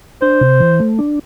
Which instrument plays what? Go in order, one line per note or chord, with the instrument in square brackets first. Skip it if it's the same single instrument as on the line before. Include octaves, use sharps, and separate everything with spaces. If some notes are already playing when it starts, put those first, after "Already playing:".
[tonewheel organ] D4 [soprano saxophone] C5
[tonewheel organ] C3
E3
A3
D4